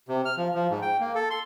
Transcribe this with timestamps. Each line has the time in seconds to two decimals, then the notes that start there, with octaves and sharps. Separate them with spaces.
0.08 C3
0.25 F6
0.37 F3
0.55 F3
0.70 G#2
0.82 G5
1.00 A#3
1.15 A4
1.30 C6